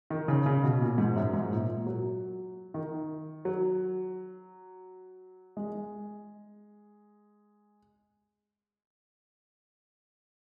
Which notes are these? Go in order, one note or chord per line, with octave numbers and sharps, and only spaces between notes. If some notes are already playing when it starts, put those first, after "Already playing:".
D#3
C#3
C#3
B2
A#2
G#2
F#2
G#2
A#2
A#2
F#3
D#3
F#3
G#3